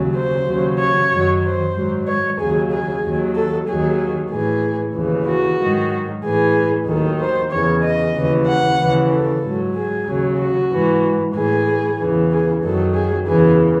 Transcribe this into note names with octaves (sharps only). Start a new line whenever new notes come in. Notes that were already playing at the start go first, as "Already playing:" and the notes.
Already playing: D#2 C#3 F#3
C5
D#2 C#3 F#3
C#5
F#2 D#3 F#3
C5
G#2 D#3 F#3
C#5
D#2 C#3 F#3 G#4
G#4
D#2 D#3 F#3
A4
D#2 D#3 F#3 G#4
A2 E3 G#4
D#2 C#3 E3
F#4
G#2 D#3 F#3
A2 E3 G#4
D#2 D#3 F#3 A4
C5
E2 C#3 E3 C#5
D#5
D#2 C#3 E3
F#5
D#2 C#3 E3
A4
G#2 F#3
G#4
D#2 C#3 F#3
F#4
G#2 E3
A2 E3 G#4
E2 C#3 E3
G#4
F#2 D#3 F#3 A4
G#4
E2 C#3 E3 G#4